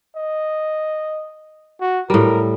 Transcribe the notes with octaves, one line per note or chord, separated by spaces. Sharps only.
D#5
F#4
A2 G3 A#4